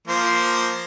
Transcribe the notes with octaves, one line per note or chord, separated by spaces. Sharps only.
F3 A#3 C5